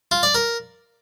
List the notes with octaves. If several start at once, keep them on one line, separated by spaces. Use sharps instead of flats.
F4
D5
A#4